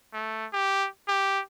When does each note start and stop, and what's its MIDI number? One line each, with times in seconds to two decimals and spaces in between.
0.13 0.46 57
0.53 0.88 67
1.08 1.41 67